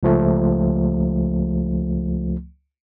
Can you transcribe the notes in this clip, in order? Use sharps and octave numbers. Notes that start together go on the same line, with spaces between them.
C#2 F3 A3